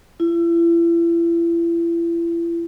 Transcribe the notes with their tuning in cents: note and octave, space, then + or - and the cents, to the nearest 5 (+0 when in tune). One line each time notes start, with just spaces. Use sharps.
E4 +35